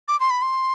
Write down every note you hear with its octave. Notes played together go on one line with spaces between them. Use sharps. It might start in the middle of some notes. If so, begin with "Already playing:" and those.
D6
C6
B5
C6